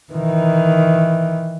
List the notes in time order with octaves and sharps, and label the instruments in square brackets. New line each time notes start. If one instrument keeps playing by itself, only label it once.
[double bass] D#3 E3